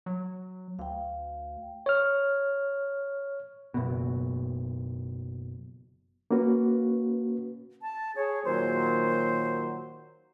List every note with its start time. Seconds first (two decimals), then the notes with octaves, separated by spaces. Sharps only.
0.06 F#3
0.79 D2 F5 G5
1.86 C#5 F6
3.74 F#1 B2
6.31 A#3 C#4 F#4 B4
7.82 A5
8.16 G#4 C#5
8.45 A#2 D#3 F#3 C5